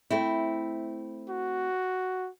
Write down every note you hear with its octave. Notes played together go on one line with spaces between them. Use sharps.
A3 C4 E4
F#4